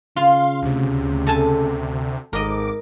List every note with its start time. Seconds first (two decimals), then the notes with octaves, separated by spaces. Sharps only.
0.16 C#3 F4 F5 C6
0.62 D2 C3
1.27 A4 G#5 A5
2.33 G#1 G#2 A#4 D#5 D6 D7